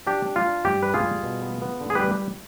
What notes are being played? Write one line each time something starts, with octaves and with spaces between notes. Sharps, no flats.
D4 G4
D4
F4
D4
G2 G4
G3 B4
F4 G#4
G3
B2
B3
B3
D3
G#4
G3 G4 B4